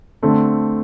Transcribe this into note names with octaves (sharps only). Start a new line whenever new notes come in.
D3 A3 C4